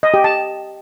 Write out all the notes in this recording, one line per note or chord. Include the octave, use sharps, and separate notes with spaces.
D#5
G4
A5